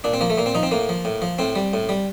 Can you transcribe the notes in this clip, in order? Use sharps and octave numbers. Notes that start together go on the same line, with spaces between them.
A#2 D4
C4
F3 A#3
A3
A#2 A#3
C4
F3 D#4
C4
A2 A#3
F3
A2
F3
A2 C4
G3
A2
G3